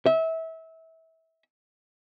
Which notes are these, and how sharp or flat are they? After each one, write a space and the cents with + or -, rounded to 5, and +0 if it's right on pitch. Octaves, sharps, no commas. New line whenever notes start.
E5 -25